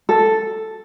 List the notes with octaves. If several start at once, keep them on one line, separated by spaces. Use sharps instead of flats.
A4